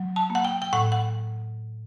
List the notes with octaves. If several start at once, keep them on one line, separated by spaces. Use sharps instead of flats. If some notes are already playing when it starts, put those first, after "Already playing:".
Already playing: F#3
A5
A#3
F#5
G5
G5
A2 F#5
F#5